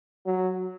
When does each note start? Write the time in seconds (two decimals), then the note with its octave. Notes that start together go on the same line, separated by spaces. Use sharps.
0.26 F#3